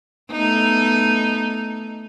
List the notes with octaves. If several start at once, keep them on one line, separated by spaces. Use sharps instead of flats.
A3 B3 D#4